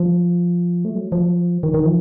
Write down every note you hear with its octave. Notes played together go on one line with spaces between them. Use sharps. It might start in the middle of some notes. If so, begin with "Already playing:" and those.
Already playing: F3
A3
F#3
F3
D#3
D#3
F3